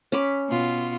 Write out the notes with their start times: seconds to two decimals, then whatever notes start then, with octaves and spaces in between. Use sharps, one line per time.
0.12 C#4 B5 D6
0.49 B2 F4